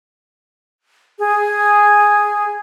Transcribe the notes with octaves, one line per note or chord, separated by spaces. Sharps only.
G#4